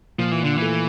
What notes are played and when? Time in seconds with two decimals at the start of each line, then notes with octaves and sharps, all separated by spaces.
0.18 A#2 F3
0.32 E3
0.44 D3
0.57 E3 A3